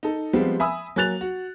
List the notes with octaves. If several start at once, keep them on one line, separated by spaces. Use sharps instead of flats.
D#4 A4
F3 G3 G#3 B3 C4
E5 G#5 B5 D#6 E6
F#3 A#3 G#5 F#6 A6 F7
F#4